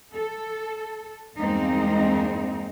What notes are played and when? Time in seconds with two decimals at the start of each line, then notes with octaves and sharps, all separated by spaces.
0.14 A4
1.39 E2 G2 G#3 A#3 C4 D#4